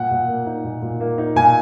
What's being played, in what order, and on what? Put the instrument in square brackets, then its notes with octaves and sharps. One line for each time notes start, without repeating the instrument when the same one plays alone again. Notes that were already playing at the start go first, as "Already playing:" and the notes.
Already playing: [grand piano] A#2 F#5
A#2
A#3
D#4
A#2
A#2
A#3
D#4
A#2 G#5